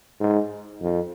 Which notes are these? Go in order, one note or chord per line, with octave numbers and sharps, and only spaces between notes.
G#2
F2